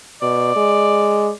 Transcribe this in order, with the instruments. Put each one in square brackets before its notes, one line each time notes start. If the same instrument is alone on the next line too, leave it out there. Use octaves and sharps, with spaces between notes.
[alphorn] B2 [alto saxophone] D5
[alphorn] G#3